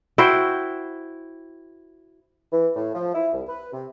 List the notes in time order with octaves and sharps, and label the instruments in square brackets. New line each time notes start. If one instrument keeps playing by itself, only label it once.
[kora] E4 F#4 C5 G5
[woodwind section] E3
A2
F3
E4
C2
B4
C3